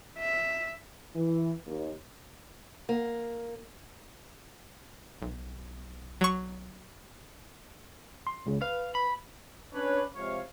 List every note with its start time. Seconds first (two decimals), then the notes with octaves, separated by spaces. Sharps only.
0.18 E5
1.16 E3
1.67 D#2
2.89 A#3
5.22 B1
6.21 F#3 C#6
8.27 C6
8.46 C#2 C#3
8.61 B4 F5
8.95 B5
9.73 C#4 D4 B4 C#5
10.15 C3 F3 G#3 C#5 F5